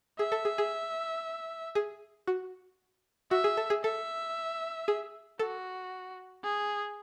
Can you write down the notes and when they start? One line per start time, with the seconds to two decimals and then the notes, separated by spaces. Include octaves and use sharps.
0.19 G#4 E5
0.32 A4
0.45 G#4
0.58 G#4
1.75 G#4
2.27 F#4
3.31 F#4 E5
3.44 G#4
3.57 A4
3.70 G#4
3.84 A4 E5
4.88 G#4
5.39 F#4 A4
6.44 G#4